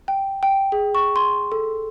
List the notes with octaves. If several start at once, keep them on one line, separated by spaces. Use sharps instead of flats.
G5
G5
G#4
C#6
C6
A4